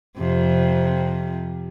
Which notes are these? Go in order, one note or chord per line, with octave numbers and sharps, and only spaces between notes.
F2 C3